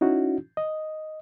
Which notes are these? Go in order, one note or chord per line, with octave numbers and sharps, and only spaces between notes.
C#4 D#4 E4 F#4
D#5